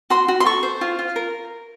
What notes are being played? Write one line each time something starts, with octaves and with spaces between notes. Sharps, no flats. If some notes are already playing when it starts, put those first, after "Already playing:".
F#4 C6
F#4
C6
A4 C#6
C5
F4
F4
A#4